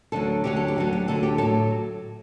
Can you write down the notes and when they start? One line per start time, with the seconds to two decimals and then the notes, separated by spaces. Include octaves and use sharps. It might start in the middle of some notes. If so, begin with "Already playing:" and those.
0.12 D2 D3 F#3 A4
0.44 D2 D3 F#3 G4
0.56 A4
0.68 G4
0.76 D2 D3 F#3 A4
0.93 G4
1.08 D2 D3 F#3 A4
1.23 G4
1.38 A2 F#3 A4